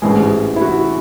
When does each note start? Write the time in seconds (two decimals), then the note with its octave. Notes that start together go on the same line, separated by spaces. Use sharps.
0.02 A1 G#2 E3 G#3 G#4
0.56 E4
0.62 F#4